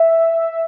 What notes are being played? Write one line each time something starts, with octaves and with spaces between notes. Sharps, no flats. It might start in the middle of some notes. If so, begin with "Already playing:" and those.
Already playing: E5